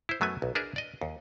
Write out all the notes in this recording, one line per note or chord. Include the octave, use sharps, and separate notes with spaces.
E4 C5
F#2 F#3 A3 B3 G#5
B1
D4 G#4 A#4 B4 E5
D5 D#5
D#2